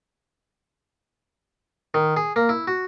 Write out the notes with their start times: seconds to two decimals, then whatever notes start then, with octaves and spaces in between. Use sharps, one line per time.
1.94 D#3
2.17 G#4
2.36 A#3
2.49 E4
2.67 F#4